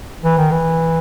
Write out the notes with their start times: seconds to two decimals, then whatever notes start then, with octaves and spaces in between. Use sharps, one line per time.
0.24 E3
0.38 D#3
0.51 E3